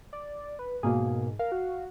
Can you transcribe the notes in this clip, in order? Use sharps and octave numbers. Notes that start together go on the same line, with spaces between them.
D5
B4
G#2 B2 A#3 G#4
A#4 F5
F#4